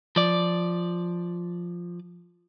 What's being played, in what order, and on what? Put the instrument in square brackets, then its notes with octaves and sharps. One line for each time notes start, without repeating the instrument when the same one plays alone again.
[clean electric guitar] F3 D5